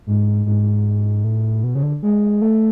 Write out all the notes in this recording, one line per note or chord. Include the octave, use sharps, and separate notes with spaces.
G#2
G#2
A2
B2
C#3
D3
G#3
A3